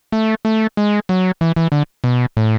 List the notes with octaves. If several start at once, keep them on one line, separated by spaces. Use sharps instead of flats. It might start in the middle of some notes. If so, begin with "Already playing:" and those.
A3
A3
G#3
F#3
E3
E3
D3
B2
A2